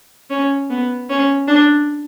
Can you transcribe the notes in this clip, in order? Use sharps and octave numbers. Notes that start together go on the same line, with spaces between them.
C#4
B3
C#4
D4